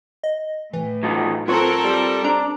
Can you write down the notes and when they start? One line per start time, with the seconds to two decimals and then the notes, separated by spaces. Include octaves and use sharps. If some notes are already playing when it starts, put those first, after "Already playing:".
0.24 D#5
0.73 A2 E3
1.03 F#3 D#4 F4
1.48 F#3 C4 F4 A4 A#4 C#5
1.84 G3
2.24 D4 A#5